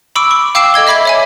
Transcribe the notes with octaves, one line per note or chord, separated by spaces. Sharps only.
B5 C#6 D6 E6 D7
C#6
F5 G5 D6 E6 C7 E7
A4 D#5 G#6 G7
D#5 E5 B5 D6 G#6
C#5 E5 G#5